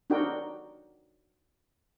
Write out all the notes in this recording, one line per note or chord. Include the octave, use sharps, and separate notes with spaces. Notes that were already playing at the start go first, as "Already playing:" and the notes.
D4 D#4 F#4 A#4 G5